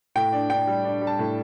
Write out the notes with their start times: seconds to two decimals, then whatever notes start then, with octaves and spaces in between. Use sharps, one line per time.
0.16 A2 G5
0.32 D4
0.50 D4 G5
0.67 G3
0.85 D4
1.01 G3
1.07 A5
1.19 A2